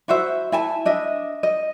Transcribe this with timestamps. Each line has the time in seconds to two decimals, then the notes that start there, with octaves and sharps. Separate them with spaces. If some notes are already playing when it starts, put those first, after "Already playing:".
0.08 E4 F#4 C5 E5
0.52 E4 G#5 A5
0.85 D4 D#5 E5
1.43 D#5